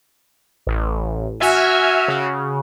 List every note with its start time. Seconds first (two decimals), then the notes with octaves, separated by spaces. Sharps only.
0.67 A1
1.41 F#4 E5 G#5 F6
2.08 C#3